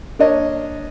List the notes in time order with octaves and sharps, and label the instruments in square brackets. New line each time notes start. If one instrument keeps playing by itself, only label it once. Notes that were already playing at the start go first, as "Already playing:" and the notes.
[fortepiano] A#3 D4 C#5 D#5